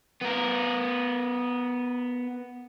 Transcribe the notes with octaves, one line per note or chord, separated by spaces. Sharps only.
B3 A#4